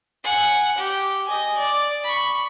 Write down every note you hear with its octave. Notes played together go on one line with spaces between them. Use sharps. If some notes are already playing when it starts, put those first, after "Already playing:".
F#5 G#5
G4
D#5 G#5
D5
B5 C#6